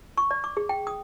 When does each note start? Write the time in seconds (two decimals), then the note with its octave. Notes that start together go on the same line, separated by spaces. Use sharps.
0.18 C#6
0.31 D5
0.44 D6
0.57 G#4
0.69 G5
0.87 D#6